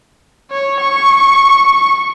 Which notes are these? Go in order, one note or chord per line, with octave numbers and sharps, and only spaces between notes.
C#5
C#6